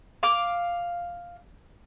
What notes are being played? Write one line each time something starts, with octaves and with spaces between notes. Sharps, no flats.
F5 D6